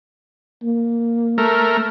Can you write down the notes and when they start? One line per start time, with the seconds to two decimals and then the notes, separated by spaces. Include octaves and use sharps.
0.63 A#3
1.38 A3 A#4